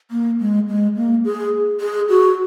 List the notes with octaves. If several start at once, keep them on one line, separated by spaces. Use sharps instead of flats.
A#3
G#3
G#3
A#3
G#4
G#4
F#4